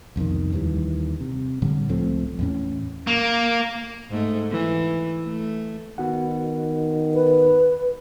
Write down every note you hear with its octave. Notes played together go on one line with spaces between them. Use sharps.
C2 F2 B2 D#3
D#2 D#3 E3 G3
C3
A2 D3 G3
C#2 F3 A3 C4
E2 A2 C#4
A#3
G#2 A3
E3
A3
D#3 B3 F#4 F#5
B4